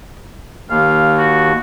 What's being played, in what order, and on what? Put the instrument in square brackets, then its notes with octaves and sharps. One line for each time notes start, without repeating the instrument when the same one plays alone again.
[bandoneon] D#2 [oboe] F5
[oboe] F#4